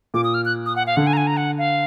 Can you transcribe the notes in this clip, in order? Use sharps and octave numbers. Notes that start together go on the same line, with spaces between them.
A#2 D6
D#6
F6
F#6
D#6
F#5
F5
D3 F#5
G#5
A#5
G#5
A#5
F#5
F5